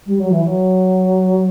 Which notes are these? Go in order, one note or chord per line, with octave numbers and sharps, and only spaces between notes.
G3
F#3
E3
F#3